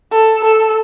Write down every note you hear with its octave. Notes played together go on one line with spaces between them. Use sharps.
A4
A4